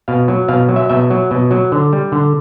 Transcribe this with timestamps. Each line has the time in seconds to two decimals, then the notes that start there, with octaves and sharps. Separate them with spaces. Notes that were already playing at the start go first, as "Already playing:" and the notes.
0.08 B2 F5
0.28 F#3
0.48 B2 F5
0.68 F#3
0.76 E5
0.89 B2 E5
1.10 F#3
1.31 B2
1.51 F#3
1.72 D3
1.93 G3
2.12 D3